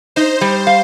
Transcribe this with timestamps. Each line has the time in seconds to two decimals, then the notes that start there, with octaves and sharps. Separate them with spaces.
0.16 D#4 C5
0.41 G3
0.67 F5